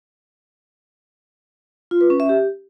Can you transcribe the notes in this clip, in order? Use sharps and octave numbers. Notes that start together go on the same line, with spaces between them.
F4
B4
C#4
E5
G4